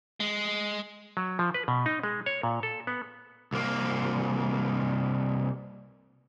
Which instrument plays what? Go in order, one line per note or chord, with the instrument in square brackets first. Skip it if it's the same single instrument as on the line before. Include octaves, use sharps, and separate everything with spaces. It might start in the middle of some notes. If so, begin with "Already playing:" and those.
[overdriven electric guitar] G#3
[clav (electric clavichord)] F#3
F3
B4
B2
D#4
G#3
C#5
A#2
A4
B3
[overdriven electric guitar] C2 A#3